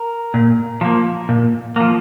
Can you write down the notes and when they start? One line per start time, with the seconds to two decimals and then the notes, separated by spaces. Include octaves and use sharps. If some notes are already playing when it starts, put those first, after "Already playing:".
Already playing: A#4
0.34 A#2
0.81 F3 A#3
1.29 A#2
1.76 F3 A#3